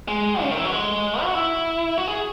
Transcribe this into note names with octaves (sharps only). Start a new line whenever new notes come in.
G#3
C#3
D#3
E3
F#3
G#3
F#4
E4
F#4
G#4